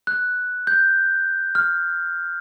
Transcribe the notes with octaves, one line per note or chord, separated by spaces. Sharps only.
F#6
G6
F6